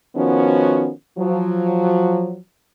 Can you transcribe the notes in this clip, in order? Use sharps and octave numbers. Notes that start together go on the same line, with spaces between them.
D#3 F3 B3 C#4 F#4
F3 F#3